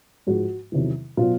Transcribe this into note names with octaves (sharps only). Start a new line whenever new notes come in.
G#2 F3 G#3 F#4
E2 C3 D#3 F#3
B2 F#3 F4